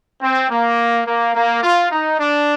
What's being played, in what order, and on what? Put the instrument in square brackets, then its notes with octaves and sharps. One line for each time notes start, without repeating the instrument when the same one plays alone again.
[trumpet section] C4
A#3
A#3
A#3
F4
D#4
D4